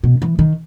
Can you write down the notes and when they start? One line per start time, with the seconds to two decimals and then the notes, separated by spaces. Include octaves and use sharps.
0.03 B2
0.22 E3
0.39 D#3